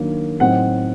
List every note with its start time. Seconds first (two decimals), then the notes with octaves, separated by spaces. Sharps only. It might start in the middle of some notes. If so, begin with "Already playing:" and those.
Already playing: D#3 F#3 A#3 D4
0.40 A2 F#3 C4 D#4 F#5